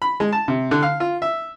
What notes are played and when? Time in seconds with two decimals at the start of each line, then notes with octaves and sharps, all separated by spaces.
0.02 B5
0.20 G#3
0.33 A5
0.48 C3
0.71 D3
0.83 F5
1.00 F4
1.22 E5